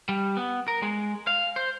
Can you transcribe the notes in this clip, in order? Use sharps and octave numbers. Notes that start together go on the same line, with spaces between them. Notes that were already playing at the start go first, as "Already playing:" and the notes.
G3
B3
A#4
G#3
F5
C5